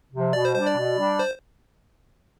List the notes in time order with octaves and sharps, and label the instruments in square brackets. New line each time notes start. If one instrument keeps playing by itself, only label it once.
[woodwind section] C3 F3
[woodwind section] B2 [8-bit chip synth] D5
[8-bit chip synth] C5
[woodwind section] G3 D4 [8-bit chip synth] C5
[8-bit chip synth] D5
[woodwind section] B2
G3 D4
[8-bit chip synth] C5